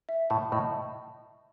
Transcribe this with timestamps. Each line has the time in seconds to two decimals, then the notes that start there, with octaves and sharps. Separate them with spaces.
0.09 E5
0.30 A2 A5
0.52 A2 D#5